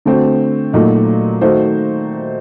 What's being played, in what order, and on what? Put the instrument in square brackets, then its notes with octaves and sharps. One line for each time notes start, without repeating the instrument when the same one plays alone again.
[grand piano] D3 A3 C4 F#4
A#2 F#3 A3 D#4 F#4
D#3 A3 D#4 F#4 C5